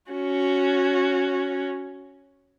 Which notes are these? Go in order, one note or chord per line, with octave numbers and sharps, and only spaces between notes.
C#4 F#4